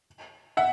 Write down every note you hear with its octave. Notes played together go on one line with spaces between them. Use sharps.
E5 F#5